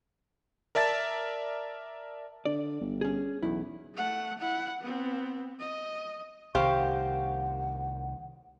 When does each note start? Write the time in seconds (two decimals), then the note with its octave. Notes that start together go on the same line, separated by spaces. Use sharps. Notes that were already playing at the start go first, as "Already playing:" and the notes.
0.75 A#4 D5 E5 A5 A6
2.45 D3 D5
2.81 G1
3.01 C#4 G#4
3.43 B1 E2 E4
3.95 A3 F#5
4.39 E4 F#5
4.81 B3 C4
5.59 D#5
6.55 C2 D#3 G4 C5 F5 C#6
6.78 F#5